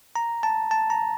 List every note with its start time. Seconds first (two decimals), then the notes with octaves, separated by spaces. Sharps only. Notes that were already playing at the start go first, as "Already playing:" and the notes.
0.16 A#5
0.43 A5
0.71 A5
0.90 A#5